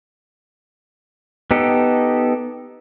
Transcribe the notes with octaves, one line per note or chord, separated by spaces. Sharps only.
B3 D#4 G4 A4